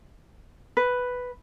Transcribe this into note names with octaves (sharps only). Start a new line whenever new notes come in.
B4